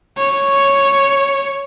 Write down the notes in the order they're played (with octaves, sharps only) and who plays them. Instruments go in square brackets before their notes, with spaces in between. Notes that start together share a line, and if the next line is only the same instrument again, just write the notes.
[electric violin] C#5